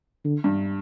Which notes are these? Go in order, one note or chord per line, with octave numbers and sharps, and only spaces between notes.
D3
G2